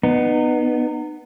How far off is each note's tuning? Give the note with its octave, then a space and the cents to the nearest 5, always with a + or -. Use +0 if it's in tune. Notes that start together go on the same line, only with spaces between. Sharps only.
B3 +0 D#4 -30